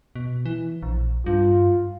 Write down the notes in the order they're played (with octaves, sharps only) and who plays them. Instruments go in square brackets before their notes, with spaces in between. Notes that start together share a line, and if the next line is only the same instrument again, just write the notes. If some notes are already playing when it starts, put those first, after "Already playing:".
[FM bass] B2
E3
A#1
[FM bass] G2 [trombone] F4